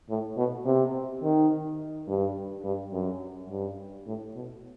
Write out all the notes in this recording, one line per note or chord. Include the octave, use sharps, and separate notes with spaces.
A2
B2
C3
D#3
G2
G2
F#2
G2
A2
B2